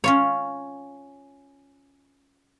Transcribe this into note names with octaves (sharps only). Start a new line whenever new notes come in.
C#4 F4 C#5